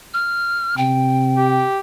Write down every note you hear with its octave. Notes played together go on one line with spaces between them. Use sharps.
F6
C3 G5
G4